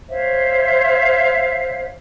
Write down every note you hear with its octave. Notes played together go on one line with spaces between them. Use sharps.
C5 C#5 E5 F5